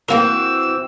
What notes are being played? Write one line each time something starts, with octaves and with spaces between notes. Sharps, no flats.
E3 A#3 C4 F#4 A#4 E6